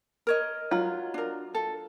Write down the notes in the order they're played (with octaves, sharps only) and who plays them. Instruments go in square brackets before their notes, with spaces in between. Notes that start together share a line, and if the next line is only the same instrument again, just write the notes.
[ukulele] A#4 C#5 D#5
[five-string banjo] F#3 F4
[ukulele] D4 A#4
A4